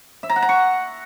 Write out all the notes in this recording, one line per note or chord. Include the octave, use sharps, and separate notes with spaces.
E5
A#5
F#5
A#5
C#6